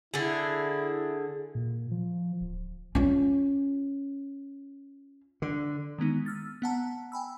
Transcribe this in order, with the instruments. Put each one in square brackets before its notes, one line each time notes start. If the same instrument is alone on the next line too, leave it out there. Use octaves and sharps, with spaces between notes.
[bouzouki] D3 G#4 [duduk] E4
[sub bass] A#2
F3
D1
[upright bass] C#4 F4
[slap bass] D3
[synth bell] D#3 G#3 B3 D#4
E6 F6 A6
B3 F#5 A5 A#5
G5 G#5 B5 E6